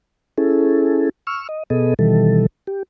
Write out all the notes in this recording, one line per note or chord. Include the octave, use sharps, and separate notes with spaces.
C#4 E4 G#4 A4
C#6 E6 F6
D#5
B2 B3 G#4 A4 D#5
B2 D#3 E3 G3 A4
G4